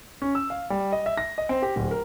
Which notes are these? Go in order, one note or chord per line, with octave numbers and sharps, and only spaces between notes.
C#4
E6
F5
G3
D#5
E5
A#6
D#5
C4
G4
D1
A#4